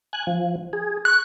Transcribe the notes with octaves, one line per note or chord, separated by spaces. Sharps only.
G#5 F#6
F3
G#4
C#6 F#6